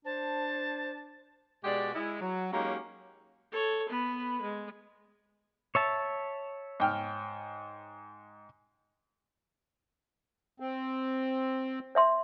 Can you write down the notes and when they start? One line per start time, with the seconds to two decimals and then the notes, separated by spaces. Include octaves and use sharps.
0.05 D4 C5 A5
1.64 B2 G#3 F#4 G4 D5
1.94 G#3 E4
2.21 F#3
2.52 F#3 G#3 A#3 C#4 D#4 G4
3.51 A4 C#5
3.89 B3 B4
4.42 G#3
5.75 C#5 E5 A5
6.80 G#2 G5 F6
10.60 C4
11.95 C#5 E5 C6